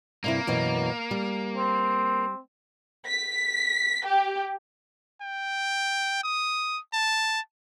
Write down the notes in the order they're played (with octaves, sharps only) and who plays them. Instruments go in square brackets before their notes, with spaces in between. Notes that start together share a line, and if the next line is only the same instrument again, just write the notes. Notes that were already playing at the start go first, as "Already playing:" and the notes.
[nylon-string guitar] G2 C3 E4 [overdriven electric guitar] A#3
[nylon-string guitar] F#2 B2 E3
G3
[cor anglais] C4
[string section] B6
G4
[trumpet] G5
D#6
A5